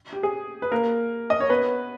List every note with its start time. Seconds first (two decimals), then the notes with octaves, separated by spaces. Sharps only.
0.13 G4
0.23 G#4
0.62 B4
0.71 A#3 A#4
1.30 D#5
1.40 C#5
1.49 B3 B4